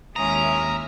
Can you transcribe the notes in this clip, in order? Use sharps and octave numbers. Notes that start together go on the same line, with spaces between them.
D#2 G#3 C#4 E4 E5 A#5 D#6 F6